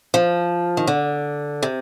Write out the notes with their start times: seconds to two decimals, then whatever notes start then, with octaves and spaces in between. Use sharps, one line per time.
0.14 F3
0.77 D#3
0.87 D3
1.63 C3